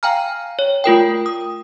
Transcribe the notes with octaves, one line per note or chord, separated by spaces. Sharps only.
F5 G5 G#5 A#5 F6
C#5
A3 F4 A#4 G5
D#6